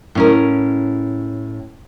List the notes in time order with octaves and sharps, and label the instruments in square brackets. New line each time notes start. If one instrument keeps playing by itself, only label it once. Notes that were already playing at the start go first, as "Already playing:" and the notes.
[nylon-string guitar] A2 C#4 A#4